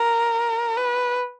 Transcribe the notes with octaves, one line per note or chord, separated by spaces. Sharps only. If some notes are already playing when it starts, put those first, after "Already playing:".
Already playing: A#4
B4